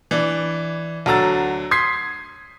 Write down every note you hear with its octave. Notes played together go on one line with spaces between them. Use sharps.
E3 D4
D2 F#3 A#5 E6 A6
C6 D#6 G#6 B6 C7